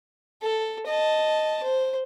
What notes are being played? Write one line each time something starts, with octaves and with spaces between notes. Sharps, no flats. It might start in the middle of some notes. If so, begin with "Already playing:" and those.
A4
D#5 A5
C5